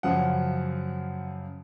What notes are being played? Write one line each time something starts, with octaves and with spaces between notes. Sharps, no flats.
F#2 C#3 F3 F#5